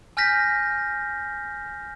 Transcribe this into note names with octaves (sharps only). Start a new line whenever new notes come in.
G#5 F6 G6 A#6 B6